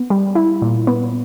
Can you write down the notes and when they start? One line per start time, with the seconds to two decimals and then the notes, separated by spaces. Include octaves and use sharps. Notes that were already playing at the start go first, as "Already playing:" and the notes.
Already playing: B3
0.10 G3
0.35 E4
0.62 A#2
0.87 B3